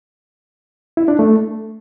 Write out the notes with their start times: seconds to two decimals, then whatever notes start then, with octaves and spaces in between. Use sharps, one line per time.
0.97 E4
1.08 D4
1.19 A3